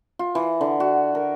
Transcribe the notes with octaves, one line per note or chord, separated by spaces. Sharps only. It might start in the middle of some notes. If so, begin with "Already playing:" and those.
F4
E3
D3
F#4
A#4